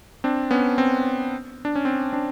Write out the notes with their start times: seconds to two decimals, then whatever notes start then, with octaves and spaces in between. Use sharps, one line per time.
0.24 C4 D4
0.51 B3 C#4
0.78 C4
1.65 D4
1.76 C#4
1.85 C4
2.12 C4 D4